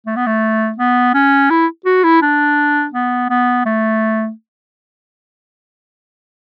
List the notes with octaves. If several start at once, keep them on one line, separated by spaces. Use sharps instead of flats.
A3
B3
A3
B3
C#4
E4
F#4
E4
D4
B3
B3
A3